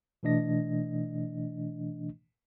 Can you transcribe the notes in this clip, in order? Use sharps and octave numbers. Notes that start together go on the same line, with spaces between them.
B2 E3 A3 D4 D#5 A#6